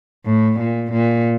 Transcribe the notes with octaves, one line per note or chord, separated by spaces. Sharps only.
A2
A#2
A#2